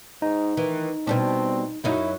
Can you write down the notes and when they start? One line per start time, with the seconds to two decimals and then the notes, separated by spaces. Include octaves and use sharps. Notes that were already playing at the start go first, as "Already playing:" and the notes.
0.22 G#2 D#4
0.57 D#3 E3
1.07 B2 G3 C4 D4
1.84 F#2 F#3 D#4 E4